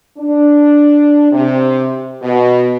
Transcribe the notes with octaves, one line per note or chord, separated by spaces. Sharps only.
D4
C3
B2